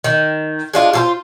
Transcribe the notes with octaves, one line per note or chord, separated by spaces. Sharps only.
D#3
G#3 D4 F4
F4 A4 C5